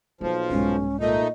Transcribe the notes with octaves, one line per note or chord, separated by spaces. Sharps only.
B1 F3 F#3 A#3
C2 G#2 C#4
A#2 A3 D#4 D#5